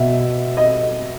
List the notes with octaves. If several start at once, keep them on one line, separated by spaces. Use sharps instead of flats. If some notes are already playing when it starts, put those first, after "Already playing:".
Already playing: B2 E5
D#5